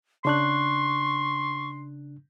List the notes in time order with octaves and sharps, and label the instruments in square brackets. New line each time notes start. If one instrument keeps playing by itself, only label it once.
[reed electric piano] C#3 D4 F#6 [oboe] C6 [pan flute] C#6